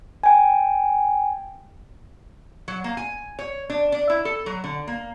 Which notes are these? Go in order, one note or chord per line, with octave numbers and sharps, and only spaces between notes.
G5 G#5
F#3
A#3
G#5
C#5
D4
D4
E4
A4
F#3
D3
A#3